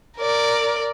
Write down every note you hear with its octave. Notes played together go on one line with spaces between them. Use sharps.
A#4 D5